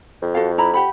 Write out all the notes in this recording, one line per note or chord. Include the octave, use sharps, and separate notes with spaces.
F2
F#4 A4 F5
E4 A#5 B5
G4 F#5 B5